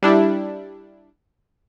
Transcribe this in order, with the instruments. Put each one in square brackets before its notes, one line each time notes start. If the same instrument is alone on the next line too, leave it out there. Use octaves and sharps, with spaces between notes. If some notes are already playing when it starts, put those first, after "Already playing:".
[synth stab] G3 D4 E4